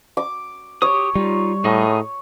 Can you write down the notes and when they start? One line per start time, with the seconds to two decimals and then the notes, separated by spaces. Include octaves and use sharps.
0.17 D6
0.82 G4 C#5 D#6
1.15 G3 D#4 F4
1.64 A2 D#4 G#4 D#5